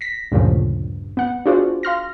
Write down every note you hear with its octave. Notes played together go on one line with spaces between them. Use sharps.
A#6 B6
D2 G2 A#2 C#3 F3
B3 F#5
D4 F4 F#4 G#4 C5 D5
F5 C6 F6 A#6